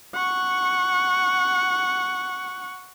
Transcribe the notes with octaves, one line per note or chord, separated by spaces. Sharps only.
F#5 C#6